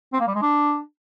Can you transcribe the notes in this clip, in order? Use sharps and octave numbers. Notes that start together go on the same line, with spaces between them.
C4
A#3
G3
G#3
D4